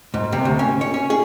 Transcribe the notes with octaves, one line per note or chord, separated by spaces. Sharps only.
G#2
C3
D2
C#4
C#5
C#4
G#4